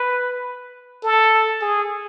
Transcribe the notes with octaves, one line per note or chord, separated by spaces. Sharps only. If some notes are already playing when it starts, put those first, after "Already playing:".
Already playing: B4
A4
G#4